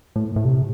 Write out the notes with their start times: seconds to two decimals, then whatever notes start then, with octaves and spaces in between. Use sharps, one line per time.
0.16 A2
0.36 A2
0.45 C3